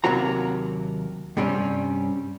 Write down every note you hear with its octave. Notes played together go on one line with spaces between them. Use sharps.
D#2 C3 F#3 A#3 F#4 A#5
G2 C3 G3 C4 C#4